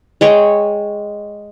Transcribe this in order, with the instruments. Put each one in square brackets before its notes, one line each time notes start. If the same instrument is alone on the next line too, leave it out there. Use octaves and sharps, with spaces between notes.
[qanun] G#3 C#5 G5